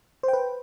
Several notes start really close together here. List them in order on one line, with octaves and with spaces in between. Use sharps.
C5 G5 B4